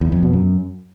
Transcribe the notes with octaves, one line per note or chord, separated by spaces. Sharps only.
E2
F2
B2
F#2